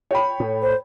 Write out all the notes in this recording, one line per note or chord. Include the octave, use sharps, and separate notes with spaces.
C#5 G5 B5
A2
C5